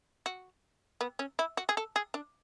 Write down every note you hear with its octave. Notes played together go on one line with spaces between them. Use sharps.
F#4
B3
C#4
E4
F#4
G#4
A4
G#4
D4